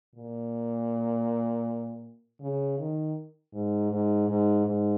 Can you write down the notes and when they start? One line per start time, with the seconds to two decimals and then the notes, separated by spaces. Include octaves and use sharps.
0.16 A#2
2.40 C#3
2.79 D#3
3.53 G#2
3.91 G#2
4.29 G#2
4.66 G#2